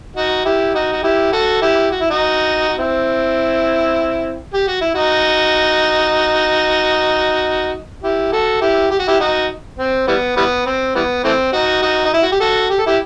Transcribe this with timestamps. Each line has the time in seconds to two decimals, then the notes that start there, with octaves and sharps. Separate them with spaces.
0.16 D#4 F#4
0.45 E4 G4
0.74 D#4 F#4
0.93 F#4
1.03 E4 G4
1.33 F#4 A4
1.62 E4 G4
1.91 F#4
2.01 E4
2.10 D#4 F#4
2.69 F#4
2.78 C4 E4
4.54 G4
4.68 F#4
4.81 E4
4.95 D#4 F#4
8.03 E4 G4
8.32 F#4 A4
8.61 E4 G4
8.90 G4
8.99 F#4
9.08 E4 G4
9.20 D#4 F#4
9.78 C4
10.07 E3 G3 B3
10.37 E3 G3 B3
10.66 C4
10.95 E3 G3 B3
11.24 E3 A3 C4
11.53 D#4 F#4
11.82 D#4 F#4
12.05 D#4
12.14 E4
12.23 F#4
12.32 G4
12.40 F#4 A4
12.70 G4
12.79 A4
12.87 E4 G4